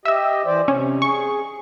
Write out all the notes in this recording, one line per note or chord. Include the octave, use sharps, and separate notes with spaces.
G4 D#5 E5 E6
E3 C5 D5
C3 C#4
G#4 C#6